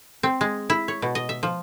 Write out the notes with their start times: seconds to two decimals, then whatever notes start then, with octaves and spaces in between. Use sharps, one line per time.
0.23 C4
0.41 G#3
0.70 E4
0.88 C#5
1.02 B2
1.15 D#5
1.29 E5
1.43 F3